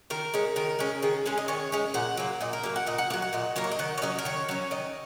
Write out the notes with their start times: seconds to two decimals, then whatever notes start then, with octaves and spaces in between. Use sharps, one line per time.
0.10 D#3 A#4
0.34 G#3 C#4
0.56 D#3 A#4
0.79 G#3 C#4
1.03 D#3 G#4
1.26 G#3 C#4 G#4
1.38 D#5
1.48 D#3 C#5
1.72 G#3 C#4
1.94 A#2 F#5
2.17 F#3 A#3
2.41 A#2 D#5
2.53 A#4
2.64 F#3 A#3
2.76 F#5
2.87 A#2 D#5
2.98 F#5
3.10 A#3 F#5
3.14 F#3
3.22 F#5
3.33 A#2 D#5
3.56 F#3 A#3 A#4
3.64 C#5
3.72 D#5
3.79 D#3 F#5
3.98 C#5
4.02 F#3 C#4 D#5
4.19 A#4
4.25 D#3 C#5
4.49 F#3 C#4
4.71 D#3 D#5